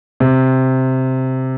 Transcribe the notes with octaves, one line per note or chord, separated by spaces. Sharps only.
C3